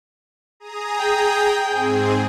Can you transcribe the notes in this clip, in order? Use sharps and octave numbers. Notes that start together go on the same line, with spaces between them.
G#4 A#5 D#6
G5
G#2 C4 G#4